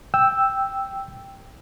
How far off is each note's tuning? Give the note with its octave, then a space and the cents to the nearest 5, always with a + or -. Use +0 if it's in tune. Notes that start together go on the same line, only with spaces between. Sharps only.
G5 +0 E6 +0